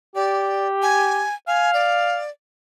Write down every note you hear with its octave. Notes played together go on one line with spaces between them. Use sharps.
G4 D5
G#5
F5 G#5
D5